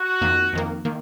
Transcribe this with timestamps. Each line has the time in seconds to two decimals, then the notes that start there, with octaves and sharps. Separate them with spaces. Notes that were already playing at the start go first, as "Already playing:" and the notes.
Already playing: F#4
0.21 F2 D#3 A#3
0.53 F2 D#3 A#3
0.85 D#3 A#3